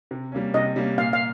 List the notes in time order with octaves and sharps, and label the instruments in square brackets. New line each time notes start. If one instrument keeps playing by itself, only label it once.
[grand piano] C3
G3 A#3 C#4
[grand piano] C3 [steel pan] D#5
[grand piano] G3 A#3 C#4
[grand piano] A#2 [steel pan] F5
[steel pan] F5